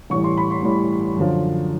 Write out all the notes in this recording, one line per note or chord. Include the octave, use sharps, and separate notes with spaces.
A1 A2 E3 G3 C#6
C6
B5
C6
A1 A2 E3 G3
F#2 D3 F3